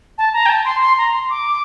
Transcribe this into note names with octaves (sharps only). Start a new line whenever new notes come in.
A5
A#5
G5
A5
C6
C6
A#5
C6
D6